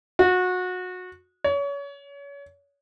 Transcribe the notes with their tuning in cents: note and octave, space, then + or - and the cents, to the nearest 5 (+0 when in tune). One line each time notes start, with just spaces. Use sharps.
F#4 -25
C#5 +30